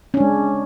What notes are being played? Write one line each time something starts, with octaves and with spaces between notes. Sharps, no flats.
G#3 C#4 D4